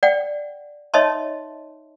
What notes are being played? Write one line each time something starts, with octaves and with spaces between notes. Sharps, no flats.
D5 F#5 G5
D#4 C#5 D#5 E5 A5 C6